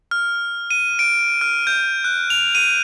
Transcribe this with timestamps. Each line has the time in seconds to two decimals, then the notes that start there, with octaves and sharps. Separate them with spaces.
0.11 F6
0.71 D#7
0.99 D7
1.41 F6
1.67 G6
2.04 F#6
2.30 F7
2.55 D#7